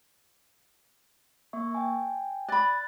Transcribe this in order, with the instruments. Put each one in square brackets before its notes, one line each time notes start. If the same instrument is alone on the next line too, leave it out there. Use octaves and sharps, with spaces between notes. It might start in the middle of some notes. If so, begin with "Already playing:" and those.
[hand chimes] A#3 E5 C#6
G5 G#5
[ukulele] D5 B5 [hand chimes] F#6 A6